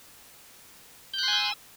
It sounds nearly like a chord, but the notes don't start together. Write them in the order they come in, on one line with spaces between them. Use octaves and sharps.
G6 F#6 C6 G#5 E6